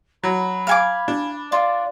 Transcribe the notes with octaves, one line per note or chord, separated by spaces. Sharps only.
F#3 B5
F5 G#5 D6
D4
F4 D5